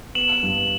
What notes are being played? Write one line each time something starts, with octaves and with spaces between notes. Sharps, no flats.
B3 E7 F#7
G2